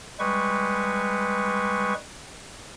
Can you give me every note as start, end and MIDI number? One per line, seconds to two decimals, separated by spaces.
0.19 1.94 55
0.19 1.94 56
0.19 1.94 71
0.19 1.94 85